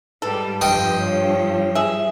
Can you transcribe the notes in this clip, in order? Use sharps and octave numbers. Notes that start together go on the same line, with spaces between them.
G#2 G3 A4 B4
G2 F3 G3 D#5 G5
C#5
G#4 E5